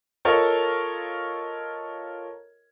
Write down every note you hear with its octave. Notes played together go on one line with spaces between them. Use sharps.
F4 A4 A#4 C#5 D#5